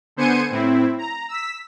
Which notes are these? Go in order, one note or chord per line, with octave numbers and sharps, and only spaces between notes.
D3 B3 C5 G#5 C#7 D#7
A2 C4 E4
A#5
E6 B6